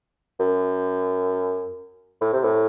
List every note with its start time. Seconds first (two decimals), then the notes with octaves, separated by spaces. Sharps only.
0.40 F#2
2.21 A2
2.33 C3
2.43 A2